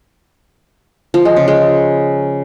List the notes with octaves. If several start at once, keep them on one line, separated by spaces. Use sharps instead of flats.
F3
G#3
C#3
G#3